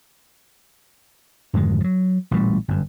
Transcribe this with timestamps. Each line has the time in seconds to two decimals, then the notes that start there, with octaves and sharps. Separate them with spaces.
1.53 F2 G#2 D3 D#3
1.81 F3 F#3
2.31 A1 A#2 G3
2.68 G1 F#2